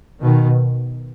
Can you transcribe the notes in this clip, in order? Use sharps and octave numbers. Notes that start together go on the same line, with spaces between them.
B2 D#3